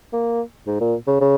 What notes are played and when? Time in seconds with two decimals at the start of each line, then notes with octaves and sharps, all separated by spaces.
0.13 A#3
0.67 G#2
0.81 A#2
1.07 C#3
1.21 C#3